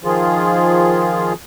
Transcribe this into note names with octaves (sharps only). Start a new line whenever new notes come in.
D#3 F3 F4 G#4